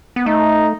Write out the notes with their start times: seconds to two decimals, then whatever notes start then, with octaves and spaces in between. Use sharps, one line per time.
0.16 B3
0.26 A3 D#4